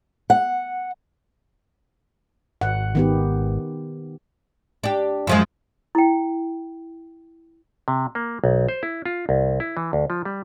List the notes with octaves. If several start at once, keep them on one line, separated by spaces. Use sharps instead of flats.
F#5
G#1 F#5
D#3 B3 G4
D4 G4
F#2 F3 G#3
E4 G5
C3
A#3
B1
C5
E4
F4
C2
E4
E3
D2
F3
G3